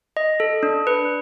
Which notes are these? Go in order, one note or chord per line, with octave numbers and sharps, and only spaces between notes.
D#5
A4
D4
B4